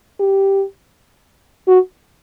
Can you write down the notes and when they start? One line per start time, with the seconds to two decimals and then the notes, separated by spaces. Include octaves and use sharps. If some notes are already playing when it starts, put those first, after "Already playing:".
0.20 G4
1.67 F#4